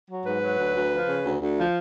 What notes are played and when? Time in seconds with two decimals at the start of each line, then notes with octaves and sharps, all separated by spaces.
0.09 F#3
0.25 G#2 B4
0.42 F#3
0.59 D2
0.76 D2
0.92 F3
1.08 C#3
1.25 D2
1.40 D2
1.57 F3